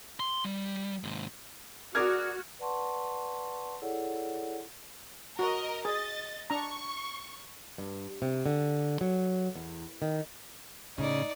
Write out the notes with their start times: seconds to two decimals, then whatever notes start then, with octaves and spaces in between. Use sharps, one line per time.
0.20 C6
0.44 G3
1.03 D#2 G#2
1.95 F#4 G#4 A#4 D5 F6 G#6
2.59 B4 D5 F#5 A5 C6 C#6
3.82 E4 G#4 A4 C#5 D5 F#5
5.39 F#4 A#4 D#5
5.85 G#4 D#5 A6
6.50 D4 A#5 C#6
7.78 G2
8.22 C3
8.46 D3
9.01 F#3
9.55 E2
10.02 D#3
10.98 A2 C#3 D#4 D5